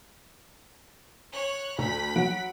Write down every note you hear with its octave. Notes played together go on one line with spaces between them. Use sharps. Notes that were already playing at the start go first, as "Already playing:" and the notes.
C#5 F#6
D2 B5 B6
F#3 F#5 D7